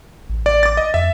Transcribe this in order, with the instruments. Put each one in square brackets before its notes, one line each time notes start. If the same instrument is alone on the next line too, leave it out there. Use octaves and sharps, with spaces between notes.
[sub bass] A1
[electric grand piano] D5
D6 A6
D#5
[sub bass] F2 [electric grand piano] E5